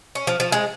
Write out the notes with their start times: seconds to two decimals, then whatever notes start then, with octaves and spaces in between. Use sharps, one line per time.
0.15 C#4
0.27 F3
0.40 F3
0.52 G#3